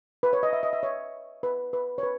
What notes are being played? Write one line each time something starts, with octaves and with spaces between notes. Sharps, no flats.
B4
C#5
D#5
E5
D#5
E5
C#5
B4
B4
C#5
B4